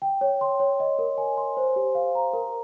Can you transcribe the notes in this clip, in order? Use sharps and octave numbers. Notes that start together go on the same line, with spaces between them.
G5
C#5
C6
C#5
D#5
A#4
G#5
C6
C5
G4
F5
A#5
A#4